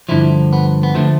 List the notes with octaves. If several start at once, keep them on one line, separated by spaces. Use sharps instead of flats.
G2 D3 F3 E4
B3
B3
D3 F3 A3